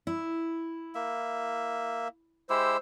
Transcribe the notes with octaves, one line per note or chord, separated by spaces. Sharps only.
E4
A#3 E5
G#3 E4 G4 C5 E6